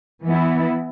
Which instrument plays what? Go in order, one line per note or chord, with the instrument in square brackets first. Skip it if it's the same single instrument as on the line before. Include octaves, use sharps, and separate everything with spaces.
[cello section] E3 B3 E4